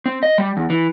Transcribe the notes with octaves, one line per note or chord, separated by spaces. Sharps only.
C4
D#5
G3
E2
E3